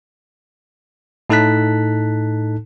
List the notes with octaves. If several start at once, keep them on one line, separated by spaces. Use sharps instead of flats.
A2 D#4 A4 A5 F#6 B6